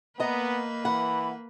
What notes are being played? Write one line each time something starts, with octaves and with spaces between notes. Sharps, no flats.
A#3 B3 B4 D#5 A#5
E3 F#5 B5